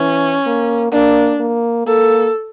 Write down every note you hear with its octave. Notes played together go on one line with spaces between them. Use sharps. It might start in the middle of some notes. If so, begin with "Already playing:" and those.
Already playing: E3 C#4
A#3
A#3 D4
A#3
A#3 A4